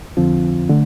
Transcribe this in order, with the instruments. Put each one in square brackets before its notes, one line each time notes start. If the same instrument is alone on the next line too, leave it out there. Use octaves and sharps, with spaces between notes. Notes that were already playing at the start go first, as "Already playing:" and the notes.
[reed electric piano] F2 D3 F3 C4 F4
D3 A3